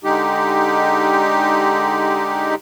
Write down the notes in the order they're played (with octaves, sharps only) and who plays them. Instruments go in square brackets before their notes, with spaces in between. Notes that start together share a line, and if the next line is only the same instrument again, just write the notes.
[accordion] D3 G#3 D#4 G4